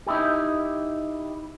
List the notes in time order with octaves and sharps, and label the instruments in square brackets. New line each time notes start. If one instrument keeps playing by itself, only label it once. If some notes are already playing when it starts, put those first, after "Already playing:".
[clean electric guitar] D#4 E4 G4